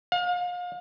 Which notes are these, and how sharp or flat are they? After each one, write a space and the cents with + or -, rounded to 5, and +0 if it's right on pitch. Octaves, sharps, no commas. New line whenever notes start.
F5 +35